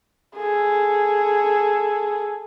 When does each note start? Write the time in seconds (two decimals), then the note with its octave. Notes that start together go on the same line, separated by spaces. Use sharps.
0.36 G#4 A4